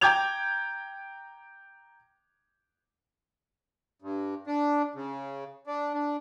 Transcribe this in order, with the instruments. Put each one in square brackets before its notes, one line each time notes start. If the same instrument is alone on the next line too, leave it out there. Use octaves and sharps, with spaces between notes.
[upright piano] G5 A#5 D6 G6 G#6 F7
[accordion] G2
D4
C#3
D4
D4